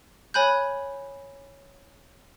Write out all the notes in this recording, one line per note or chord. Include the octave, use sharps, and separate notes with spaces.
C#5 G#5 B5 F#6 G6